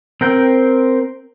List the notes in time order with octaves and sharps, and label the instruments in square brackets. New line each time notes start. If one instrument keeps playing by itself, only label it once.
[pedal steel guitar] C4 A#4 G5